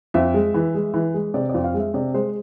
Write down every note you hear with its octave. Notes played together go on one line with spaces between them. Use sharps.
F2 E5
G#3
E3
G#3
E3
G#3
C3 D5
F2 D5
F5
G#3
E5
C3 D5
G#3 C5